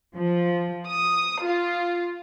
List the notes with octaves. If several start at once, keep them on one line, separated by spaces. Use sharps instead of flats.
F3
D#6
F4